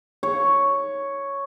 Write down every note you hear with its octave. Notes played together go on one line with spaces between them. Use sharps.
C#5